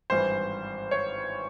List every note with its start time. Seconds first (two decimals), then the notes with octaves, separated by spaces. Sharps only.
0.10 G#1 G2 E3 C5
0.91 C#5